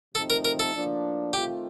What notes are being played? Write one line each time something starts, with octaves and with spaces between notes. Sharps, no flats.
C3 F3 A3 C4 D#4 A4
A#4
A#4
A4
A2 F3 A#3 D4
D#3 A3 C4 F4 G4